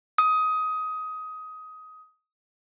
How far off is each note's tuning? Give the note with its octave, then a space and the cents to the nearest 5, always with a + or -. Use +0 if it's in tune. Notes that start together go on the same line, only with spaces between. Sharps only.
D#6 +20